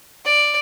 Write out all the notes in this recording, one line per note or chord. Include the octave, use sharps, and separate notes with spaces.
D5